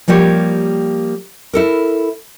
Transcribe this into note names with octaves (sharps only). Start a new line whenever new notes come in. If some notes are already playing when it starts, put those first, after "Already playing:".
F3 G3 A#3 G4 C#5
E4 A4 A#4